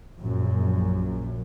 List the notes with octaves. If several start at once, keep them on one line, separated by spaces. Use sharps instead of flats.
A#1 F#2